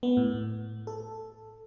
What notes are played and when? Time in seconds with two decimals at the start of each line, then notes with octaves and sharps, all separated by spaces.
0.03 B3
0.17 A2
0.87 A4